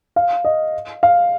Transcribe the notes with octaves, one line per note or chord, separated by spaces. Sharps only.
F5
D#5
F5